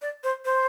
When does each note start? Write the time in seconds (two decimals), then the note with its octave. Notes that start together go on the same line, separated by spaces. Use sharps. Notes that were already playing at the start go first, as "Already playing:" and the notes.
0.02 D5
0.24 C5
0.45 C5